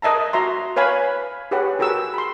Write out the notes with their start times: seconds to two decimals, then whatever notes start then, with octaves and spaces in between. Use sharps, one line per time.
0.02 A#4 D#5 E5 A5 A#5
0.33 F#4 E5 A#5 C6
0.76 B4 C#5 F5 G#5 B5
1.51 G4 G#4 B4 C#5 F#5 G5
1.79 F#4 G#4 A#4 G5 E6
2.14 B5 C6